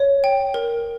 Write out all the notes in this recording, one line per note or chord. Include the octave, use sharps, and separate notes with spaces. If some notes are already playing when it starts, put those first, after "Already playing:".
Already playing: C#5
G5
A#4